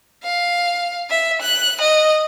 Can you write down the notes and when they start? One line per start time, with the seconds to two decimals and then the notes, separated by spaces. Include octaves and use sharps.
0.23 F5
1.10 E5
1.42 F#6
1.81 D#5